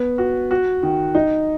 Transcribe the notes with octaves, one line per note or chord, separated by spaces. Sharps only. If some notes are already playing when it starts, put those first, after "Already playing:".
Already playing: B3
F#4
F#4
D#3
D#4